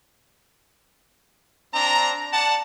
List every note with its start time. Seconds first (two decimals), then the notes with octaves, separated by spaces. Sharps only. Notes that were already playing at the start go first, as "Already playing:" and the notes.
1.74 C4 D4 A#5
2.33 D5 F#5 A5